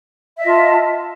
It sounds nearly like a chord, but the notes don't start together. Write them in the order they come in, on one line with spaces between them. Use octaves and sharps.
E5 D#5 F4 A5